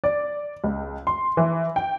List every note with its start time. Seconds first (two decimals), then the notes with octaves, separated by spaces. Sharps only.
0.04 D5
0.64 C#2
1.07 C6
1.37 E3
1.76 G5